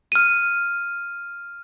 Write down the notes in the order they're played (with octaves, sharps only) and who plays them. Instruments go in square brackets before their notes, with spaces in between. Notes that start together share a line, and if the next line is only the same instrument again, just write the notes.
[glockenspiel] F6 D#7